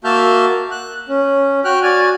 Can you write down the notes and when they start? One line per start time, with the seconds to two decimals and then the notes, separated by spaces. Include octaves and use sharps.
0.04 A#3 F#4 E5 A5 F6 G6
0.71 F#6
1.08 C#4
1.65 F#4 G5 F6 F#6
1.83 F#4 D5 G#5 F6